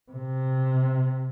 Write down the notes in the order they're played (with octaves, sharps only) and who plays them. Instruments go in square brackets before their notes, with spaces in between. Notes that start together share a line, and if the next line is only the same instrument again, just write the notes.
[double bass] C3